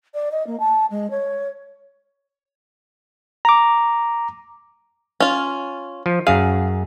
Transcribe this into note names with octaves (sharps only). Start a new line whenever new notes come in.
D5
D#5
A#3
A5
G#3
C#5
A#5 D6
C#4 F4
F3
F#2 G#4 F5